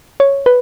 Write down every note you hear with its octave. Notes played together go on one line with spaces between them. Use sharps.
C#5
B4